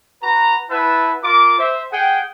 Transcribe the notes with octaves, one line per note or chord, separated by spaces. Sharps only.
F#4 B4 A#5
E4 B4 E5 F#5 A5
F4 A#4 D6
C5 E5
G#4 F#5 G5